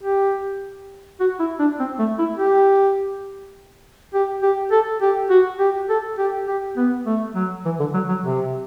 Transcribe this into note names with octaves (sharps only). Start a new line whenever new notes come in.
G4
F#4
E4
D4
C4
A3
E4
G4
G4
G4
A4
G4
F#4
G4
A4
G4
G4
B3
A3
F#3
E3
D3
F#3
F#3
C3